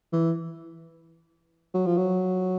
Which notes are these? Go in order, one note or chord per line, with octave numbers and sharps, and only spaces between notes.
E3
F#3
F3
F#3